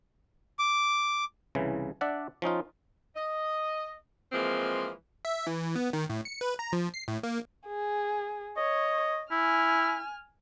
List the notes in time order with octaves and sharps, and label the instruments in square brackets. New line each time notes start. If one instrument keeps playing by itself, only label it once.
[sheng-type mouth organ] D6
[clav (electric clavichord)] C2 C#3 E3
D4 D5 E5 F#5
F3 C#4 D#4 F4
[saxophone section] D#5
E3 F3 G#3 A#3 C4
[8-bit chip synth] E5
E3
B3
D#3
A2
C#7
B4
A#5
F3
C7
A2
A#3
[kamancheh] G#4
[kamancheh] C#5 [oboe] D#5
[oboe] E4 [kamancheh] G#5 F6